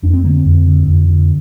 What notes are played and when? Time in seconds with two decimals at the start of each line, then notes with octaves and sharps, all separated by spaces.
0.03 F2 D4
0.13 C4
0.24 D3 A#3
0.35 C4
0.45 F2
0.66 D3
0.87 F2
1.09 D3